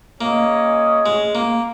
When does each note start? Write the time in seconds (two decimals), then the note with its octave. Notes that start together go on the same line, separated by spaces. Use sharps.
0.21 A#3 C#4 G#4 D#5
1.06 G#3
1.35 A#3